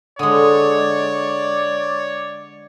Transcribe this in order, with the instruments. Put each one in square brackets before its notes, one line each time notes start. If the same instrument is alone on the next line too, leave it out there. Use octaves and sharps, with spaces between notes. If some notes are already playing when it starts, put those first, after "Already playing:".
[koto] D3 G#3 [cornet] C#5 [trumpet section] D5 [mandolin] D#6